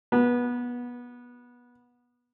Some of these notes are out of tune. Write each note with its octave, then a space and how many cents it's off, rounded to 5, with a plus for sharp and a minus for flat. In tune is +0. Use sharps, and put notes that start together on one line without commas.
B3 -20